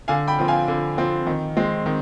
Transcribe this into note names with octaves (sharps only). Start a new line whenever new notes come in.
D3 F5 G#5
G5 B5
F3 C4
F5 G#5
D3
F3 C4
D#3
G#3 C4
D#3